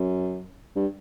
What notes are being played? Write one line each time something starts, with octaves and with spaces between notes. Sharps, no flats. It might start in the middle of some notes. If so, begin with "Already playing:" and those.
Already playing: F#2
G2